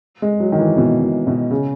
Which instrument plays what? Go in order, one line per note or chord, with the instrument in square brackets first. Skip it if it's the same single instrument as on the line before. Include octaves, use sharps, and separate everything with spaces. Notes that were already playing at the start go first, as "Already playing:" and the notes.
[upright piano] G#3
F#3
D#3
E3
B2
B2
B2
C#3